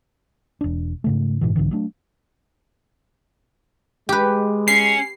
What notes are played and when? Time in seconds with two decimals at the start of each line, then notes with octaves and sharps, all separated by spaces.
0.61 E1 D4
1.04 G#2 C#3 A3
1.41 F#1 G#2 B2 E3
1.55 B1 G#2 D3 E3
1.71 F#3 A3 D4
4.09 G#3 G4 B4
4.68 C#4 C7